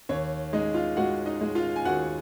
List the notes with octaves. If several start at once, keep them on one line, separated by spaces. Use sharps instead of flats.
D#2 C#5
G#3 D#4 D#5
F4 F5
G#3 F#4 F#5
D#4 D#5
G#3
F4 F5
G#5
D#2 F#4 F#5